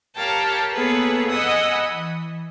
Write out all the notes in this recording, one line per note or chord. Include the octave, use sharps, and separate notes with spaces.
G4 A#4 C#5 F5 G5 A5
A#3 B3 G#4 A4 B4 C#5
D#5 F#5 G#5 B5 D#6 E6
E3